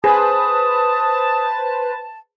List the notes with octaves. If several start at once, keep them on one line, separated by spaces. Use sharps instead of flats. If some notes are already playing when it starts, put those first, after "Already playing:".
G#4 B4 C5 A5 D#6